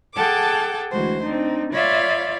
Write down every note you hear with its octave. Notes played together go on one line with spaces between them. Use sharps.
G#4 A4 F#5 G5 A5 D6
D2 E3 G#3 F#4 C5
C4 D4 D#4
F4 C#5 D5 E5 F5 B5